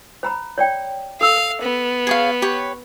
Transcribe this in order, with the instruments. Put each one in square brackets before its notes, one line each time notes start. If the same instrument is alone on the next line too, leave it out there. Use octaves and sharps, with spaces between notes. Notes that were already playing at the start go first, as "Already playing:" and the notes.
[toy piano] C5 A#5 B5
C#5 D5 G5
[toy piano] A4 E6 [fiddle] F5
[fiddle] B3
[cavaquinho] G#4 C#5 F5
G4 B4 C#5